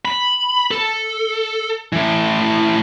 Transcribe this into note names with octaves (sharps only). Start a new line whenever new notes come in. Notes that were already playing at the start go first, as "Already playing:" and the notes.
B5
A4
A2 E3